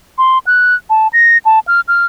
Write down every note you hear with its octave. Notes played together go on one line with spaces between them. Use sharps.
C6
F#6
A5
A#6
A5
F6
F6